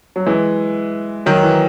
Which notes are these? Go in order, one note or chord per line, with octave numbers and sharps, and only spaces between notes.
F#3
E3 G#3
D#3 F#3
E3